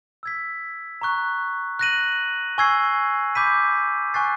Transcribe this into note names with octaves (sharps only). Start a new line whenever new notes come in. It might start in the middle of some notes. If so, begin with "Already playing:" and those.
E6 G#6 B6
A#5 C#6 F#6
F#6 A#6 D#7 F#7
G#5 C#6 E6 G#6 C7
B5 D6 G6 B6 D#7
G#5 C#6 F#6 A6 C7